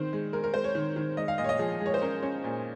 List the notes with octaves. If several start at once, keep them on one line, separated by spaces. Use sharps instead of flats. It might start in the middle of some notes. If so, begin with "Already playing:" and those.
Already playing: D#3 C4 C5
G#3
G#3 A#4
A#4
G#3 C5
C#5
D#3
D#3
G#3 D#5
F5
A#2 D#5
C#5
D#5
F3 G#4
G#3
C#5
C5
C#4 A#4
C#4
A#2